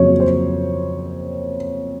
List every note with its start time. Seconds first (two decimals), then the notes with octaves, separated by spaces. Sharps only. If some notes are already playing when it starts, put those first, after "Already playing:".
Already playing: F2 C#3 F#3 A#3 C#5
0.20 C5